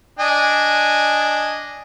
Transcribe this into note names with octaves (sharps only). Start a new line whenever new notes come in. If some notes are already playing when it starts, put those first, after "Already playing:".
D4 D#5 G#5